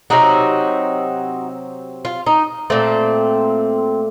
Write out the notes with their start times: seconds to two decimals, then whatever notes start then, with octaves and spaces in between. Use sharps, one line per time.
0.10 C3 F#3 C4 D#4 F#4
2.05 F4
2.26 D#4
2.70 A#2 A3 C4